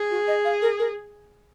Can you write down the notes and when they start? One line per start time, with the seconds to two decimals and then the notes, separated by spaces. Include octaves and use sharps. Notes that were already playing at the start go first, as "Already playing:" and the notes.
Already playing: G#4
0.11 F#4
0.28 D#5
0.45 F5
0.62 A#4
0.79 A#4